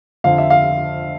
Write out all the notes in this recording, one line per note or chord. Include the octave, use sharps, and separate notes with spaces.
F2 D3 F3 F5
E5
F5